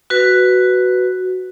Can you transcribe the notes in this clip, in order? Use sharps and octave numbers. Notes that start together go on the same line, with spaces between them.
F#4 B4